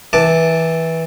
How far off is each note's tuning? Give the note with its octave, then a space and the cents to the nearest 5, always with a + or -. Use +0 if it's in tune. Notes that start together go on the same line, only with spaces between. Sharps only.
E3 -15 A5 +0 D6 +5